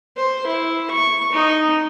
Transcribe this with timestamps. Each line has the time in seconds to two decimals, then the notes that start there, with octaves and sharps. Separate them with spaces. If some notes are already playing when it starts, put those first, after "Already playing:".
0.17 C5
0.47 E4
0.91 C#6
1.32 D#4